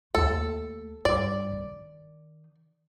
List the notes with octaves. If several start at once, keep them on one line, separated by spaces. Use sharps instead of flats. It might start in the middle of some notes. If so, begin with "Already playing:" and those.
D#2 A3 A4
G2 D5
D#3